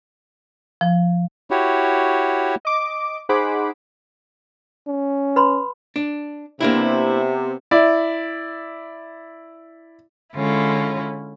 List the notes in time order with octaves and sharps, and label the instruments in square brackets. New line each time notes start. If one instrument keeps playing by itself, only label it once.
[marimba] F3
[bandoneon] E4 F#4 G4 C#5
[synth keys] D#5 D6
D#4 G#4 C5 F#5 B5 D6
[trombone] C#4
[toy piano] B4 B5 C6
[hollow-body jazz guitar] D4
[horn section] C3 B3 [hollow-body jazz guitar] A#3 D4 E4
[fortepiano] E4 D5
[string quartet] D3 G#3 C#4 E4 F4